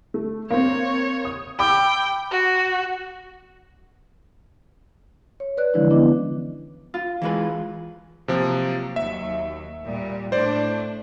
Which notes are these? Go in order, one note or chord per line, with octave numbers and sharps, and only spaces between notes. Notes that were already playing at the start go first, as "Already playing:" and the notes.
A3
A#3 C4 C#5
D#6
G5 B5 D6 E6
F#4
C#5
B4 D5 F#6
D3 E3 F3 G#3 D4 E4
B3 C#4 E4 D#5 D6
F4
E3 G#3 B4
C3 F3 F#3 A#3
D#2 F#3 E5
A#2 G3
A2 A3 D4 C5 D5